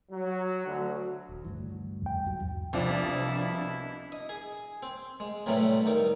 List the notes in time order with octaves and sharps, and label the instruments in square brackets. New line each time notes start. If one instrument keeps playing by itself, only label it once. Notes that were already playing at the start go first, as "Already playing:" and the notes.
[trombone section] F#3
D2
[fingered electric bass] D#1
D2 G2 E3
[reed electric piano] E2 G5
[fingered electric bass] B1 G#2 F#3
[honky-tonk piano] C2 F3 D5 [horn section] B2 E4 [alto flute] D4
[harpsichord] D#5
G#4
C4
G#3
A2 C3 F#3 G3 A3 B3
G2 D#3 D#4